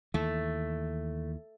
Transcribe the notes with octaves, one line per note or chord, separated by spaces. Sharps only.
D#2 E3 A3